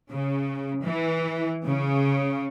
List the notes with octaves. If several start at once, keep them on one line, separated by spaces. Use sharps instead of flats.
C#3
E3
C#3